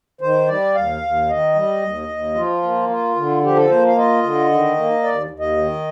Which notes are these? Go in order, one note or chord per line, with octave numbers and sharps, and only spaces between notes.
D#3 C5
G3 D5
D#2 F5
D#2
D#3 D#5
G3
D#2
D#2
F3 F4
A#3
F4
D3
F3 G4
A4
A#3 C5
F5
F4 D#5
D3
D#3
A#3
D#2 D5
D#2
D#5
D#3